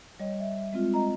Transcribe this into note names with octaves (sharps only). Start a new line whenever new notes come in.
G3 C#5 D#5
E5
G#3 C4 F4
D#5 A#5